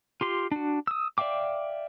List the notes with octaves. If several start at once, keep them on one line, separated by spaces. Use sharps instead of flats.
F4 G4 C6
D4 F#4
D#6 E6
D5 E5 F5 G5 D6